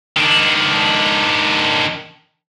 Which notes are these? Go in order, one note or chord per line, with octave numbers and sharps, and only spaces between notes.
D#3 D4